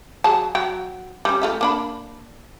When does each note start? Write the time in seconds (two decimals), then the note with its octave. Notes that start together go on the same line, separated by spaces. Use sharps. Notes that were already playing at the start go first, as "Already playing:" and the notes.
0.24 F#3 G#4 A5
0.55 F#3 G5
1.25 G3 C#4
1.42 A3 F4 E5
1.61 A#3 D4 B5